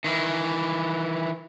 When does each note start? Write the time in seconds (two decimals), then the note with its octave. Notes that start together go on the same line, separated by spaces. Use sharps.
0.04 D#3 E3